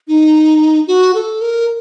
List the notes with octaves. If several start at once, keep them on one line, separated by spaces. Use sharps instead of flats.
D#4
F#4
A4
A#4